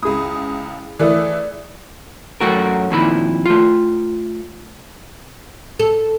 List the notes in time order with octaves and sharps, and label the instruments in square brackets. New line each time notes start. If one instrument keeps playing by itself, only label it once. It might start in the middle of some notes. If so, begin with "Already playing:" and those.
[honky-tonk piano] C#2 D#6 [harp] E4 G#4
[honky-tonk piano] E3 A3 E4 [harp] D5 D#6
[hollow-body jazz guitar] F#2 A3 F#4 A#4
F2 A#2 D#3 E4 B5
A3 F4
[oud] A4